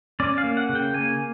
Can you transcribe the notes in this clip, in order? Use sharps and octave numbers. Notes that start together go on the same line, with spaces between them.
C#4 D5
F5
A#3
F#5
C#3
G5
A#3 G#5